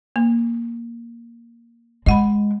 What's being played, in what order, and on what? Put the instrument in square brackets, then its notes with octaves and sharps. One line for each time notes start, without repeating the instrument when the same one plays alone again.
[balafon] A#3
[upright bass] G#3 [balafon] D#5 F#5 B5